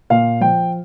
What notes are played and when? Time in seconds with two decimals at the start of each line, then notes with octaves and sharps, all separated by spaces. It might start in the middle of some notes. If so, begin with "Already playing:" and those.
0.10 A#2 F5
0.41 F3 G5